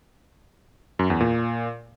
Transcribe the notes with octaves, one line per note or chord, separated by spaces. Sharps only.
F#2
E2
A#2